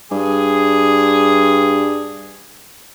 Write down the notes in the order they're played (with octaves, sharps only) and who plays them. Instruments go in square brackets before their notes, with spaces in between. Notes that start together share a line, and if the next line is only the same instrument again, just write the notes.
[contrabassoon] G2 [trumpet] G#4